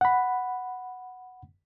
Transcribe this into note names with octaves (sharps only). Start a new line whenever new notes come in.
F#5 B5